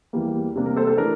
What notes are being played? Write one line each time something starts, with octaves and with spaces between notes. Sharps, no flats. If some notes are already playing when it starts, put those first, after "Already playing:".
E2 E3 G3 A#3
C3 G3 A#3 D4
A#4
A4 C5
A4
E3 A3 D4 A#4